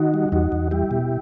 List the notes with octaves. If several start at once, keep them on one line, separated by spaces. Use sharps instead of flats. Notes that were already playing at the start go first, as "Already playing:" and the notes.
Already playing: D#3 D#4 F#4
G3
E2 D#4 F#4
E2
G3 E4 G4
B2